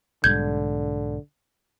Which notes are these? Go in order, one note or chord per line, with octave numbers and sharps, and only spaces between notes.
B1 G#2 D3 G3 G6 G#6